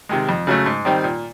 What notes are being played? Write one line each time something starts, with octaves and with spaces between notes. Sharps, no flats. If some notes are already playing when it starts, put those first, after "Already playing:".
C3 D#3 G#3
F2
C#3 F#3 A3
G#2
D#3 G3 C4 D#4
A#2